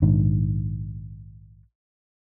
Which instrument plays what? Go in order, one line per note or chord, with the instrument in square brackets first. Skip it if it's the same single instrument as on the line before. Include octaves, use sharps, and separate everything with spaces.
[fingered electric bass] A#1 G#2 D#3 D4